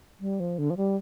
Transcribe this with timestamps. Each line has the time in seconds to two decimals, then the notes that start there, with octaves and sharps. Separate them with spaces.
0.20 G3
0.40 F3
0.58 D3
0.70 F3
0.77 G3